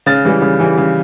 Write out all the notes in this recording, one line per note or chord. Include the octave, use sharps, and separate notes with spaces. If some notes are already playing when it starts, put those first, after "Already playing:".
C#3 A6
E3 G3
C#3
E3 G3
C#3